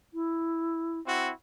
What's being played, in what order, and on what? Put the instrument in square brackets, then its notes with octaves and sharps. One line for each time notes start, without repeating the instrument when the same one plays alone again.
[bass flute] E4
[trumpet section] C4 E4 F#4